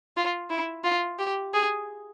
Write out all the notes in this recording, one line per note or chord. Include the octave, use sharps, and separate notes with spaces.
F4
E4
F4
G4
G#4